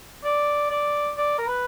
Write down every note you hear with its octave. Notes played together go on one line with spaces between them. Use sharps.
D5
D5
D5
A#4
B4